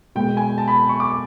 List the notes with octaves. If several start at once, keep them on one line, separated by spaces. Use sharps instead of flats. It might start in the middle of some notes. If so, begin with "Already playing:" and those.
B2 G#3 B3 G5
G#5
A5
B5
C#6
D6